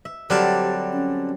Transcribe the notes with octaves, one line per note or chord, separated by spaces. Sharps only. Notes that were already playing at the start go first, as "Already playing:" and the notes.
E5
D3 F#3 G3 C4 G4 F5 A5
C#4